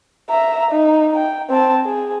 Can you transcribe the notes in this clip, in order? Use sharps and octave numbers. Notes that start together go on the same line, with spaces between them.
E5 A#5
D#4
G5
C4 A5
G#4